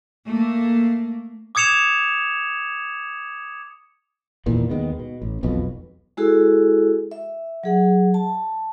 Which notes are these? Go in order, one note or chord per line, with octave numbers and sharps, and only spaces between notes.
A3 A#3
D6 D#6 G#6 C#7 E7 F7
E2 A#2 D#3 E3
D#2 D#3 G#3 B3
B2
A1
E1 B1 F2 B2
G#3 E4 F#4 G#4 A4
E5
F#3 G#4 F#5
A5